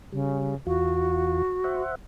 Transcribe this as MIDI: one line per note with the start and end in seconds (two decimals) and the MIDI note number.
0.13 0.56 49
0.13 0.55 55
0.67 1.42 40
0.67 1.42 65
0.67 1.82 66
1.64 1.95 72
1.64 1.95 76
1.64 1.95 78